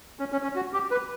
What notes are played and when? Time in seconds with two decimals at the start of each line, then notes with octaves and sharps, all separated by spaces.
0.20 C#4
0.32 C#4
0.43 C#4
0.55 F#4
0.73 G4
0.91 B4